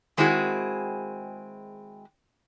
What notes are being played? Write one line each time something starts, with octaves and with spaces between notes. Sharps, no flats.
D#3 G#3 C4 E4 F#4 G#4